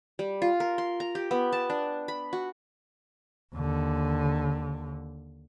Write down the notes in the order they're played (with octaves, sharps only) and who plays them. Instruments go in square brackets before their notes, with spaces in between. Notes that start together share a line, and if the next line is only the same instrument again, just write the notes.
[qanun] G3
F4
A#4
C6
A#5
G4
B3
A5
D4
B5
F#4
[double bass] D#2 D3